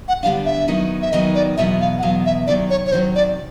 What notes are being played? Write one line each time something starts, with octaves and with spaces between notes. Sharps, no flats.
F#5
D3 G3 B3 D4 F5
E5
D#3 F#3 B3 D#4
E5
D#3 F#3 B3 D#4 D#5
D5
E2 B2 F#3 B3 E5
F5
F#5
E2 B2 F#3 B3 F5
E5
C3 D#3 F#3 D5
C#5
C#5
C3 D#3 F#3 C5
D5